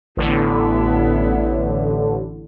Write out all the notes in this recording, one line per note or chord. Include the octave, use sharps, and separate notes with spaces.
A1 A2 D3 B3 E4